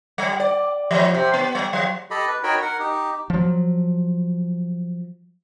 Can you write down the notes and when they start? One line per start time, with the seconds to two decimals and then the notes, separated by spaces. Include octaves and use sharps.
0.18 G3
0.40 D5
0.91 F3
1.14 C3
1.34 B3
1.55 G3
1.73 F#3
2.11 G4 A4 D#5 B5
2.28 B4
2.43 D#4 F#4 A#4 C#5 G5 B5
2.62 A#4 F#5
2.79 D#4 G4
3.30 F3 F#3